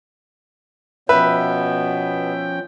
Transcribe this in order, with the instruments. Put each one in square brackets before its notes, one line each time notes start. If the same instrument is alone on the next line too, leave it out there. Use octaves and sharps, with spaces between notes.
[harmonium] B2 B3 [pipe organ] F3 C#4 G5 [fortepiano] B4 [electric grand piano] E5